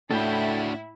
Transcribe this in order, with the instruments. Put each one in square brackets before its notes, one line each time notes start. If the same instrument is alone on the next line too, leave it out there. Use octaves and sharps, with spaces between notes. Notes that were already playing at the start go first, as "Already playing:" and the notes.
[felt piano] A2 [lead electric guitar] D4 F#4 [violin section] E4 [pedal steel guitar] A4 G5